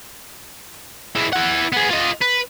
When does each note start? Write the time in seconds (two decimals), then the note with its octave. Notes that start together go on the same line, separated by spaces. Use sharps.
1.15 G#3 E4
1.33 E4 F#5
1.72 B3 G#4
1.91 F4 D#5
2.22 B4